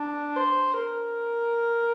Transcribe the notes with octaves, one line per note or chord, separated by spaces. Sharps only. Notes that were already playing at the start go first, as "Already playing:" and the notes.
Already playing: D4
C5
A#4